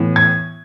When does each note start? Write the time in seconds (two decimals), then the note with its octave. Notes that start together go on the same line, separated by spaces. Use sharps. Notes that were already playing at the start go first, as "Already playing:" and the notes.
Already playing: A2 E3 B3
0.16 G#6